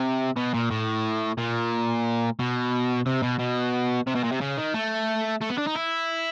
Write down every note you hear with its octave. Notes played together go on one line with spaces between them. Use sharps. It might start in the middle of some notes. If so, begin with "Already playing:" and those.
Already playing: C3
B2
A#2
A2
A#2
B2
C3
B2
B2
C3
B2
A#2
C3
C#3
D#3
A3
A3
B3
D4
D#4
E4